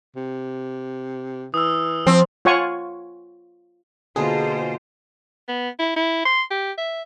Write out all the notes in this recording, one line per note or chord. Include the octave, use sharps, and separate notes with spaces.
C3
E3 D#6 E6
F3 C4
F4 C#5 F#5 G#5 C#6
B2 D3 A#3 F4 G#4 B4 C5
B3
E4
E4
C6
G4
E5